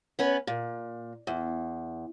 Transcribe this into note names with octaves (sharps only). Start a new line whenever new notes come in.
B3 C#4 B4
A#2
E2